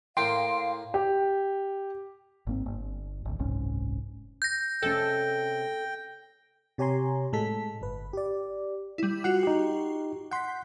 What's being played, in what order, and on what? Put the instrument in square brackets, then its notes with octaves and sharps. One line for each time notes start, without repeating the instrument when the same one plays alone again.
[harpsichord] A2 A#3 [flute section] F5 [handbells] G5 [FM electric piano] C6
[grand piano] G4
[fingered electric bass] G#1 A#3 C4
G1
G#1 D2
F#1 C2 G#2 C#4
[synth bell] G6 A#6
[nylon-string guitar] C3 G#3 C#4 [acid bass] A4 [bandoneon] G5
[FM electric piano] C3 G4 C#5 G#5 A#5 C6
A2 G#3 A4 B6
G1 B4
G4 D5
[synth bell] G3 E4
[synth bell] F4 F#4 C7 [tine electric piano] F#5
[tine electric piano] D#4 G4
[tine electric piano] F#5 C6 [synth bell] G6 B6